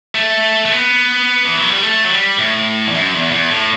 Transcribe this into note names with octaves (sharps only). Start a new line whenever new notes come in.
A3
A3
B3
E3
F#3
G3
A3
F#3
G3
A2
E2
F#2
E2
E2
A2